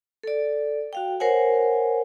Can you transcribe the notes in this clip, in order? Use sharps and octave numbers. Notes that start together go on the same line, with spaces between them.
A4 D5
F#4 F5 G5
A#4 C5 C#5 F#5 G#5